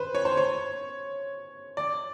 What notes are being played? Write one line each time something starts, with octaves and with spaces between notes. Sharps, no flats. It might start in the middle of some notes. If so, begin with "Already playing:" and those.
Already playing: B4 C5
C#5
C5
C#5
D5